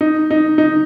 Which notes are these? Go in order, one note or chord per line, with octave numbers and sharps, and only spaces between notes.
D#4
D#4
D#4